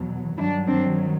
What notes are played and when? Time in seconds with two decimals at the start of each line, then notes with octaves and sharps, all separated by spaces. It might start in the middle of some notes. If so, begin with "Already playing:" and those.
Already playing: E2 B2 F#3
0.38 G2 D#3 F#3 D4 E4
0.67 C4 D4